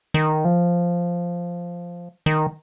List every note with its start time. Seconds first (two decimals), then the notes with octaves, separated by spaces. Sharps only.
0.14 D#3
0.45 F3
2.26 D#3